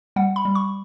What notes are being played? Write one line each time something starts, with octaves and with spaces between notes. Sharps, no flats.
G3 F#5
B5
G3
C#6